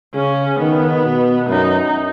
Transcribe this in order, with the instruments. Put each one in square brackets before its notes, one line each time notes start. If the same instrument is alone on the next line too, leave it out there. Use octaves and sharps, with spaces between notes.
[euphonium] C#3 [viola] C#4
[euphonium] D#3 [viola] B3
[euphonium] B2
[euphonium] F#2 [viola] D#4